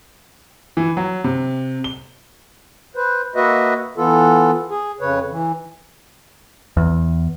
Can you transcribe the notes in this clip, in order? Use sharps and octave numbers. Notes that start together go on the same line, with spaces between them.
E3
F#3
C3
G7
B4 C5
A#3 F#4 B4 D#5 E5
E3 B3 F4 A4
G#4
F2 C#3 B4 C#5
E3
E2